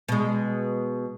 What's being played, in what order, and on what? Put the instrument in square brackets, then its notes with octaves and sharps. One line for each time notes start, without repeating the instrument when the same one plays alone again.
[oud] B2 G#3